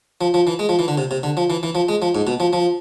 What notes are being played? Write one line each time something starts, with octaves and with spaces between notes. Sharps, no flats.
F3
F3
E3
G#3
F3
E3
D3
C3
C3
D3
F3
E3
E3
F3
G#3
F3
G#2
B2
F3
F3